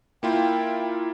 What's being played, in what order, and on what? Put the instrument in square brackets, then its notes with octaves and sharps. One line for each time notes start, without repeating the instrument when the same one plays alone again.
[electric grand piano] A#3 E4 F4 [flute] G5